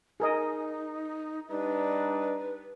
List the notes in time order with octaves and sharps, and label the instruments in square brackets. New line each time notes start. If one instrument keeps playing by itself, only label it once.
[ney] D#4 [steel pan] G#4 A#4 D#5
[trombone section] G3 D4 D#4 [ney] B4